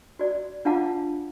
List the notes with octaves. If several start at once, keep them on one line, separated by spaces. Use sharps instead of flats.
F#4 D5
D4 F4 F5 F#5 A5 D6